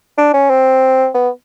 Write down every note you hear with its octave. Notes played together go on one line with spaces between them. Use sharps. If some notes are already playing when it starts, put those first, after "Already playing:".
D4
C#4
C4
B3